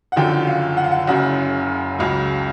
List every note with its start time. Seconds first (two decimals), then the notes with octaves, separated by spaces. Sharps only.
0.12 F#5
0.16 F#1 F#2 D3 F3 G5
0.47 F5
0.77 F#5
0.84 F5
0.91 F#5
1.07 F#1 F#2 C#3 F#5
1.99 C#2 C#3 F#3